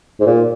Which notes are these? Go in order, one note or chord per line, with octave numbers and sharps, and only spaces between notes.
G#2
A#2